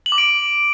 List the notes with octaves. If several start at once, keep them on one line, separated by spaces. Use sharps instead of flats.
F#7
D6
D7